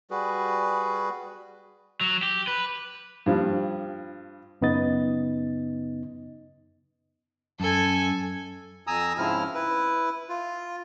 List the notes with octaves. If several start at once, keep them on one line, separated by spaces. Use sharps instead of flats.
G3 F#4 G#4 B4
F#3
G4
B4
G2 F3 G3
F#2 C#3 B3 D#4 D#5 A6
F#2 A4 G#5
F2 G#5 A#5 D#6 E6
G#2 C#3 F3 C4 E4 F6
E4 B4
F4